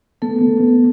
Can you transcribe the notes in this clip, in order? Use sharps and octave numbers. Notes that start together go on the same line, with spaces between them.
A3 B3 A4
B3
B3